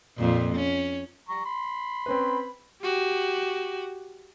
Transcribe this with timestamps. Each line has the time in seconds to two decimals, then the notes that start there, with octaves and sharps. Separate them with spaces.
0.18 F2 A#2
0.55 C#4
1.29 G3 A#5 C#6
1.45 B5 C6
2.06 C4 C#4 B4
2.82 F#4 G4